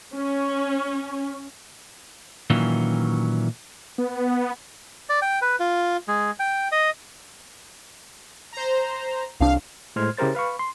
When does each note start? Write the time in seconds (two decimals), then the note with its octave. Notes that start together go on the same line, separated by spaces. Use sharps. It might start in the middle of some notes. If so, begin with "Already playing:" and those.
0.15 C#4
2.50 A#2 D#3 E3 F#3 C#4
3.98 B3
5.09 D5
5.22 G5
5.42 B4
5.60 F4
6.08 G#3
6.40 G5
6.72 D#5
8.52 C5 A#5
9.40 C2 D4 F5
9.96 A2 G#3 C5 C6 F6 G#6
10.18 C#3 E4 G4 A#4 C5 A6
10.35 B4 F5 B5 C#6
10.59 C6